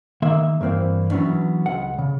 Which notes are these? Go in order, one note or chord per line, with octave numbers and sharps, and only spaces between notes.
D#3 A#3 E5
G2 E3 A#3 C4
E3 F#3 B3 C#4 D4
C#2 F#5
C#3